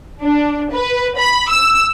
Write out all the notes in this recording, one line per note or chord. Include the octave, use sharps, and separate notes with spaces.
D4
B4
B5
E6